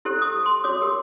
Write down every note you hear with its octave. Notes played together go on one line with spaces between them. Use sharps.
E4 G4 A4 C5
D#6
C6
F#4 C#5 D6 D#6
G4 A#4